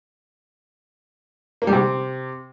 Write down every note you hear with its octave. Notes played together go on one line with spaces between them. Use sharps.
A#3
G3
C3